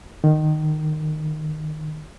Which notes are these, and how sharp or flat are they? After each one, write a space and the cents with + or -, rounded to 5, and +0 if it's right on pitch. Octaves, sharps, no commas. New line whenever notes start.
D#3 -15